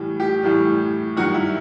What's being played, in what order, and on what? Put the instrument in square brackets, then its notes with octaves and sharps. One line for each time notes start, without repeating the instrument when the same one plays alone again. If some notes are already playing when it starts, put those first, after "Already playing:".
Already playing: [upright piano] A2 E3 G3
G4
A2 E3 G3
G2 D#3 F#3 F#4
E4